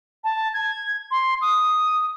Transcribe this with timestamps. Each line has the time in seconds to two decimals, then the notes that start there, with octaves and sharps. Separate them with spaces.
0.24 A5
0.54 G#6
1.11 C6
1.41 D#6